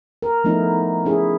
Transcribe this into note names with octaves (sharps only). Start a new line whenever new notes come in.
A#4
F3 A3 B3 D#4 E4
C#4 E4 G#4